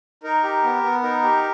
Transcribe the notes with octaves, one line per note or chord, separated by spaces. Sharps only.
D#4 A#4
G4
B3
B3
D#4 A#4
G4